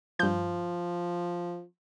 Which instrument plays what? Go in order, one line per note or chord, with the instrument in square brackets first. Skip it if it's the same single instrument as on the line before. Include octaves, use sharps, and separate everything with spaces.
[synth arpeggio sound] G2 G6 [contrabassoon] F3